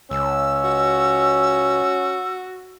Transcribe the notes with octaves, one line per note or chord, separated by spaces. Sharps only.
C#2 C#4 E6
F#4